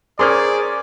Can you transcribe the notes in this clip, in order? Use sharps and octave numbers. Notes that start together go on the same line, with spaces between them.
C#4 G#4 A#4 C5 D5 C6 F6